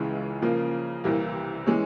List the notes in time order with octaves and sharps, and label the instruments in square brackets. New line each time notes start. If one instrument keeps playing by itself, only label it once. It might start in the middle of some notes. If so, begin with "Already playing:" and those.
Already playing: [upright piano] C#2 C#3 E3 G#3 E4
C#3 F3 A#3
C2 C3 E3 G3 A#3
E3 G#3 C#4